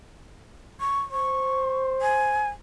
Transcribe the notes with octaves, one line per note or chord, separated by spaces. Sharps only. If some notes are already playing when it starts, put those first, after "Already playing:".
C#6
C5 C#6
G#5